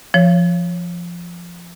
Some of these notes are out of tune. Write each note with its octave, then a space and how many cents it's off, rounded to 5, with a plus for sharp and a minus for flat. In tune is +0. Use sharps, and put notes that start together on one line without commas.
F3 -10 C#5 +0